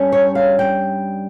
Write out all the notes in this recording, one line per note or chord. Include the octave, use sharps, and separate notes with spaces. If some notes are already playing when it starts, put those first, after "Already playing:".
Already playing: G2 G3 C#4
C#5
F5
G5